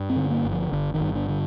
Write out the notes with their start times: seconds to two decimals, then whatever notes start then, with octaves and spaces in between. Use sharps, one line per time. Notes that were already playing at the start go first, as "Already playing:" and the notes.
Already playing: G2
0.10 C4
0.16 D3
0.30 A#3
0.45 G1
0.51 F3
0.72 G1 D3
0.94 D#3
1.01 G2
1.15 D3
1.29 D3